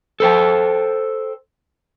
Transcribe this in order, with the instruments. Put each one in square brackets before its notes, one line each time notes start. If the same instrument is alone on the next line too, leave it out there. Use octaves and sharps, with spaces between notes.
[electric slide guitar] A4 C5 G5